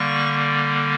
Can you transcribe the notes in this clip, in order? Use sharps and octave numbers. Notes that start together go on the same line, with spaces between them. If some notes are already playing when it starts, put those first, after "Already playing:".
Already playing: D3 G3 A#3 C#6